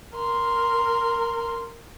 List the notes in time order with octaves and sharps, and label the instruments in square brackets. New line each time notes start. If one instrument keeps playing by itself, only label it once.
[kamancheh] A#4 C6